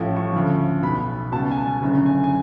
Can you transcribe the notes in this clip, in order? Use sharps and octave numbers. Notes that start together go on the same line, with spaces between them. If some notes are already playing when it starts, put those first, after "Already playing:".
Already playing: A1 A2 F3
C#6
D2 C#3 F3
B1 B2 B5
C#2 B2 A5
G#5
A5
F#1 F#2 D3
G#5
G#5